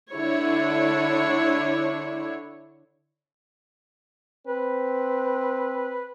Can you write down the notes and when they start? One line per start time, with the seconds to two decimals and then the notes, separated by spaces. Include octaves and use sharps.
0.14 D3 D4 E4 C#5
4.47 C4 B4